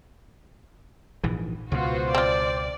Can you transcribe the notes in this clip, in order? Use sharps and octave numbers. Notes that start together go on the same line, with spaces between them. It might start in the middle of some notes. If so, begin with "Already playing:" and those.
A#1 G#2 E3
C#2 B2 B3 F4 F#4 C5
C4 F4 D5